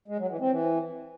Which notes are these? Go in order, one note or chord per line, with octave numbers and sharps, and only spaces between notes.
G#3
F#3
E3
C4
E3